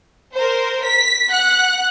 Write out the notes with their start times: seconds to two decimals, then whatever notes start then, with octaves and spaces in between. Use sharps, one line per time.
0.34 A#4 C5
0.85 B6
1.31 F#5 F#6